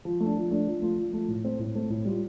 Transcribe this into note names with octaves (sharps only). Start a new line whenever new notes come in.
F3
A3 D4
F3
A3 D4
F3
A3 F4
F3
A3 F4
A2
A3 C4
A2
A3 C4
A2
G3 F4